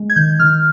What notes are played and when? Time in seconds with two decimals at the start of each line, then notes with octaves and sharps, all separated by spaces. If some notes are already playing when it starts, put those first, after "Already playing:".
Already playing: G#3
0.10 G#6
0.16 D#3 G6
0.39 D#3 F6